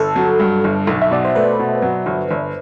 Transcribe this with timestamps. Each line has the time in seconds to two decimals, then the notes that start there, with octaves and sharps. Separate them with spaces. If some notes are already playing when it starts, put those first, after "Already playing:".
Already playing: G1 A4
0.16 F#3
0.40 G2
0.64 G1
0.87 B1
1.02 E5
1.11 B2 D5
1.25 C5
1.35 A3 B4
1.59 B2
1.82 F#3
2.06 G1
2.31 G1